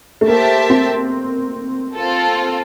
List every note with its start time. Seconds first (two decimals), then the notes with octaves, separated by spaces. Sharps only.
0.21 A3
0.27 A#3 G4 C5 E5 A5
0.70 C4
1.95 C4 F4 A4